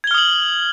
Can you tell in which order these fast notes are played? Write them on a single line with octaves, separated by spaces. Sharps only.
G#6 G7 F6 D#6 F#7